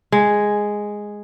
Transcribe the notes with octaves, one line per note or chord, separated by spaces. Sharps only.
G#3